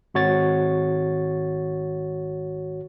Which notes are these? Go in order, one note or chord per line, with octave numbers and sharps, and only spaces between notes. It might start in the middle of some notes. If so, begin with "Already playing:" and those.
G#1 F#4 C#5 A6